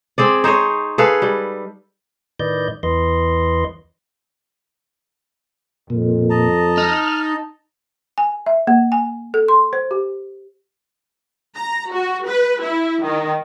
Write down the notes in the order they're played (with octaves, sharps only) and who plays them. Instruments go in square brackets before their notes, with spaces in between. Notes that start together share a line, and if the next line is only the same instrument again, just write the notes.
[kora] C4 G#4 D5
D#4 C5 C#5 D#5
G#4 A4 B4 F5
G3
[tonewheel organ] A2 D#3 B4 D5 D#5 G6
E2 E3 B4 D#5 C6
[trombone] F2 [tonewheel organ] A#2
[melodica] D#5 A5 A#5
[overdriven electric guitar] D#4 [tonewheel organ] F6
[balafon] G#5
E5
A#3
G#5
A4
C6
C5
G4
[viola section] A#5
F#4
B4
E4
D#3